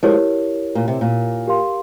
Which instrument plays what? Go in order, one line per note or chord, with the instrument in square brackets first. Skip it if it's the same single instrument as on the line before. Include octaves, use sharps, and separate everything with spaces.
[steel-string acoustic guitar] F3 G#3 [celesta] E4 G4 A#4 C#5
[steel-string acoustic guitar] A#2
C3
A#2
[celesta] G4 A#4 F5 C6